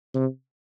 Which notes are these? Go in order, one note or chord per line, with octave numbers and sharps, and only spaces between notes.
C3